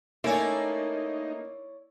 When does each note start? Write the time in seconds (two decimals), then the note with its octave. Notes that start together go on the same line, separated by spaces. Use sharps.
0.24 A3 A#3 C#4 D#4 E4 C#5 D5